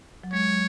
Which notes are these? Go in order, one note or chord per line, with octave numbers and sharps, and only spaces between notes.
F#3
G#3 C#5
F#3